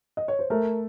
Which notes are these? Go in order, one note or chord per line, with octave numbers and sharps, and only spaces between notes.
D#5
C#5
C5
A3 A#4